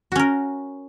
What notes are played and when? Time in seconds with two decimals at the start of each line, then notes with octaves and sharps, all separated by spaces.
0.12 F#4
0.16 C#4
0.19 A#4